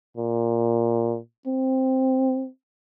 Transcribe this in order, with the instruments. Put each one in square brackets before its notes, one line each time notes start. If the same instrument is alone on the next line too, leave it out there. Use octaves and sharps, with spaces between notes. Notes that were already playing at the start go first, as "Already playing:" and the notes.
[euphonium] A#2
C4